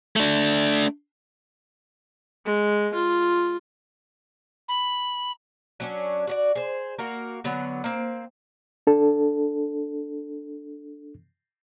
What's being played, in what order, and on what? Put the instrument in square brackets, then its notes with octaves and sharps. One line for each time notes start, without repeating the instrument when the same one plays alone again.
[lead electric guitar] A3 D4
[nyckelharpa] G#3
F4
[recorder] B5
[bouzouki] F#3 C#4 D4
F#4 C#5 D5
G#4 C5
A#3 F#4 A#4
D3 F#3 B3
A#3 C4
[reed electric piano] D4 A4